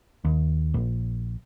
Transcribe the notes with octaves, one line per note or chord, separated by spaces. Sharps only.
D#2
A#1